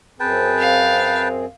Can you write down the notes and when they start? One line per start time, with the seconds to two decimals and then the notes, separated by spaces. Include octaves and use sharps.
0.20 F#2 C4 G#4 B4 G5 A5
0.59 F5